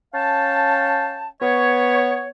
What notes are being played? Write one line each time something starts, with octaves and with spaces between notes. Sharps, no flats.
C#4 F5 G5 A5
B3 C#5